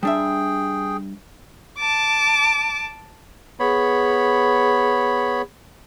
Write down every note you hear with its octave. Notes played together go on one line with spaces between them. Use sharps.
G3 D4 G#4 E5 G5
A5 D6
B3 G#4 C#5 B5